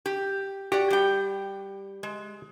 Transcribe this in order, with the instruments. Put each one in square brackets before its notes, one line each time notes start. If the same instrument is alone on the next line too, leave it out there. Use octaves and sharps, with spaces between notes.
[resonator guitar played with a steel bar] G4
[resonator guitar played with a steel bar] F#4 D5 [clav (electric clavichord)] G4
[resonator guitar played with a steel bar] G3 G5
G#3